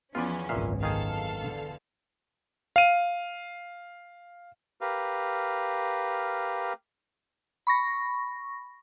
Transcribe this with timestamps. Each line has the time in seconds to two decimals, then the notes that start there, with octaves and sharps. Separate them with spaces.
0.15 E2 E3 F3 C#4 F4 B4 D5
0.49 G#1 C#2 F#2 A#2 E5 F5
0.83 D#3 G#4 A4 F5
1.42 D3
2.76 F5 D#7
4.81 G4 A#4 B4 F5
7.67 B5 C#6 A#6